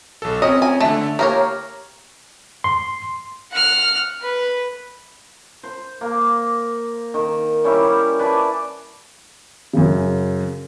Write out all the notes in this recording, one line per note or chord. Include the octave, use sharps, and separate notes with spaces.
B1 A4
C4 C#4 D#5
G#5
D3 A3 A5
A#3 G4 A#4 C#5
C6
F#5 F6
B4
C5
A#3
D#3
G3 C#4 E4 G4
B4 D5 G#5 A5
F#2 C#3